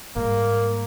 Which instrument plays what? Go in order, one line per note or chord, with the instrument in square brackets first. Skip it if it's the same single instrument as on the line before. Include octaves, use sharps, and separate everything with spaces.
[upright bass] G#2 G3 [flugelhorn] A#3